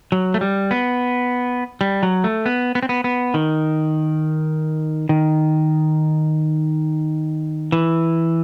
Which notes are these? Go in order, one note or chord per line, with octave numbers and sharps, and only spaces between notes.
F#3
A3
G3
B3
G3
F#3
A3
B3
B3
C4
B3
B3
D#3
D#3
E3